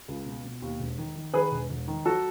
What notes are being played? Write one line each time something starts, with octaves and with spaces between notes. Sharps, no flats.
C#2
B2
B2
D#2
E1
D#3
D#3
D#3 G#4 B4
E1
E1
D#3
F#3 F#4 A4